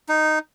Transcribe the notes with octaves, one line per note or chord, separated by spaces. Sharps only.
D#4